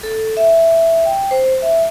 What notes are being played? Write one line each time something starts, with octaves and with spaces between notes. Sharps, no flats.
A4
E5
G5
C5
E5